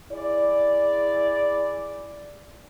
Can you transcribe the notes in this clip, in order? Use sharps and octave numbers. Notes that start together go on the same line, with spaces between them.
E4 G#4 D5